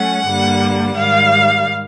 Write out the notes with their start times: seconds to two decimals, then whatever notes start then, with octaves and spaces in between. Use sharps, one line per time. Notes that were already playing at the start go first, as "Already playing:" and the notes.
Already playing: F#3 A3 C#4 F#5
0.25 G2 D3 G3 A#3
0.95 G#2 D#3 G3 F5